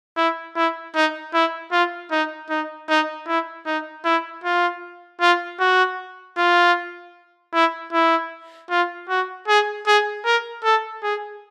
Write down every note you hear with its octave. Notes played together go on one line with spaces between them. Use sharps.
E4
E4
D#4
E4
F4
D#4
D#4
D#4
E4
D#4
E4
F4
F4
F#4
F4
E4
E4
F4
F#4
G#4
G#4
A#4
A4
G#4